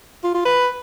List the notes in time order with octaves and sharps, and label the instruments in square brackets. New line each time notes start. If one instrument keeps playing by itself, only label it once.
[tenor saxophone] F4
F4
B4